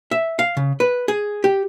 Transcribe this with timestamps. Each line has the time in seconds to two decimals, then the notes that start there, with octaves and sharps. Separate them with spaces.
0.11 E5
0.39 F5
0.57 C#3
0.80 B4
1.08 G#4
1.44 G4